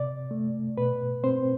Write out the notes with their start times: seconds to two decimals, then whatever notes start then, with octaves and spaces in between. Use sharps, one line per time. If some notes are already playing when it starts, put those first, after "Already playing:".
Already playing: C3 D5
0.31 A3
0.78 B2 B4
1.24 C4 C5